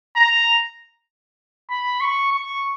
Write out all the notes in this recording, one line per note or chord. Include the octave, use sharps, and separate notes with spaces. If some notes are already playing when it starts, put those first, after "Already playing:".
A#5
B5
C#6
C#6